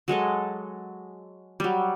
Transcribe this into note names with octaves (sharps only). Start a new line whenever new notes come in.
F#3 G#3 A4 D#5
F#3 G3